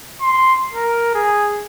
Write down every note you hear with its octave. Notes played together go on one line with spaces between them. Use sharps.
C6
A#4
G#4